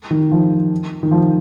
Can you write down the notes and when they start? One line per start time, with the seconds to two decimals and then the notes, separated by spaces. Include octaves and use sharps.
0.11 D#3
0.31 F3
1.03 D#3
1.11 F3